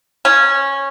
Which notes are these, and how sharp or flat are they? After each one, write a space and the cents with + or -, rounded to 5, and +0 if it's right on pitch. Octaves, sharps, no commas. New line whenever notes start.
C#4 -10